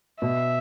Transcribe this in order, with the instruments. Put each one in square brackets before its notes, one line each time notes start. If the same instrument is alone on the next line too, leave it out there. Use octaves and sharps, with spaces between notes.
[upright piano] B2 [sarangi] E5